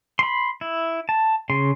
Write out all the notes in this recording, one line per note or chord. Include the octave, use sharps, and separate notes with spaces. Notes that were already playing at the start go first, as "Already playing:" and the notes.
B5 C6
E4
A5
C#3 C6